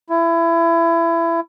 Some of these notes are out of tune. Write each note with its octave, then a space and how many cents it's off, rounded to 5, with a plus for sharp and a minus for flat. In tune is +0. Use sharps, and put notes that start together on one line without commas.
E4 +25